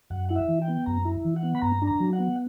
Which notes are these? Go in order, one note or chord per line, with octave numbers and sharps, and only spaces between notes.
F#2 F#5
E4 F#5
E5
E3
G5
B3
F#2 A#5
E4
E3
F#5
B3
B5
G2 A#5
D4
A#5
F#3
F#5
B3